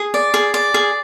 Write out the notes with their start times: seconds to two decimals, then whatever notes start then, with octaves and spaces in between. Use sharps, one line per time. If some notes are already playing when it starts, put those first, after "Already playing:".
Already playing: G#4 D#6
0.14 D5
0.34 G#4
0.54 D5
0.74 G#4